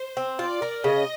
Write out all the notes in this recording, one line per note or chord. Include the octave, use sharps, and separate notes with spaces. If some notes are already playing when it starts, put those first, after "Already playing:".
Already playing: C5
C4
F4 D5
A#4
C#3 D#5